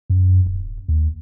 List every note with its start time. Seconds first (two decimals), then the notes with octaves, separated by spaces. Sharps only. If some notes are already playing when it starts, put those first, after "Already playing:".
0.10 F#2
0.46 D1
0.88 D#2